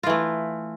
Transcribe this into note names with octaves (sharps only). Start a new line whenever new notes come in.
E3 A3 F4